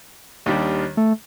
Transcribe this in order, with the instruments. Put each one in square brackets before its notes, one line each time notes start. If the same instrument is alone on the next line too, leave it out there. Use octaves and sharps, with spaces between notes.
[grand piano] D#2 D#3 G3 D4
[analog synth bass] A3